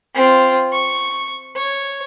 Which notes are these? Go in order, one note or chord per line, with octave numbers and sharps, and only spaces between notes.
C4 F4
C#6
C#5